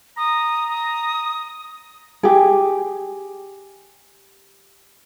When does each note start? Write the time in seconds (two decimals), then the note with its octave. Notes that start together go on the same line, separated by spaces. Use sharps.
0.17 A#5 D#6
0.69 D#6
2.23 G4 G#4